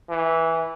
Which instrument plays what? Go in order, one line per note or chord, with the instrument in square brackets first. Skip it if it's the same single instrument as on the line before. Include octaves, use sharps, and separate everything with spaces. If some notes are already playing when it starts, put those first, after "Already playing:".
[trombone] E3